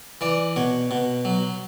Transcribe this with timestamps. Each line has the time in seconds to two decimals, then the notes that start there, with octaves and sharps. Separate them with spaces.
0.21 E3 D5
0.56 B2 C#5
0.91 B2
1.25 F#3